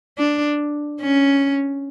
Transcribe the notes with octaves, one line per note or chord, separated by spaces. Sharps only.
D4
C#4